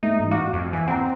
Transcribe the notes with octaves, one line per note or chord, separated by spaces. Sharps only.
A3 D#4
A1
F#4 F5 D6
F2
E3 G#5
C4 F#5 A#5